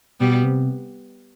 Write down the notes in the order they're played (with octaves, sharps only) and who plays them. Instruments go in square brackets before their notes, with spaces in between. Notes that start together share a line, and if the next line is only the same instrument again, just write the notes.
[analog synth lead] B2 [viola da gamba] G3 B3
[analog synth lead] C3